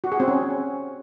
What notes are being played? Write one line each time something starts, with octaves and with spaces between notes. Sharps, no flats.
F#4
G#4
C4
C#4